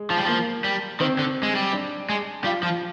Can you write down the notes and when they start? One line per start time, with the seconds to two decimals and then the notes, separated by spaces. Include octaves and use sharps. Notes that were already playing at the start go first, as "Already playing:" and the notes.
Already playing: G#3
0.10 F3
0.18 G3
0.25 F3 A#3
0.64 G3
1.00 D#3 C4
1.19 D3
1.43 G#3
1.55 G3
1.73 D4
2.10 G#3
2.44 G3 F4
2.63 F3